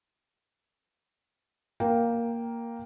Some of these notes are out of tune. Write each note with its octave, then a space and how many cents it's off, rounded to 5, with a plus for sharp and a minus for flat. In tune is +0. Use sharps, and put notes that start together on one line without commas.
A#3 +0 A#4 +5 G5 +0